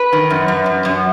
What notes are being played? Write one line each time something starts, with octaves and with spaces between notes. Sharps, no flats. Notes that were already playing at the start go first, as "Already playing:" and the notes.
Already playing: B4
D#3
F#2
F#2
F#2
F#2